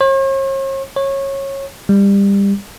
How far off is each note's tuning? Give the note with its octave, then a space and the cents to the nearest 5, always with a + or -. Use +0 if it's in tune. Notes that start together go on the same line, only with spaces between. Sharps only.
C#5 -45
C#5 -20
G3 +25